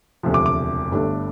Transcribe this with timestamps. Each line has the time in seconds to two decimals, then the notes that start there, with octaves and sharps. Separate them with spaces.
0.23 E1 D2 C3 F3
0.34 D6
0.46 D6
0.92 G1 G2 D3 A3 D4